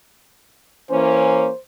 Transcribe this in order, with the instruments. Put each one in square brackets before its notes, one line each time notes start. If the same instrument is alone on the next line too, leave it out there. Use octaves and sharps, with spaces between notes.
[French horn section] E3 A#3 C#4 [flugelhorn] C5